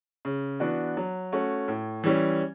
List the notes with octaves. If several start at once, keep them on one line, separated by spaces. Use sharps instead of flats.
C#3
E3 B3 D4 F#4
F#3
A3 C#4 F#4
A2
E3 G3 C#4